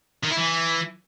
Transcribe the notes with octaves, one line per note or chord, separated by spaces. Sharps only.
D#3
E4
E3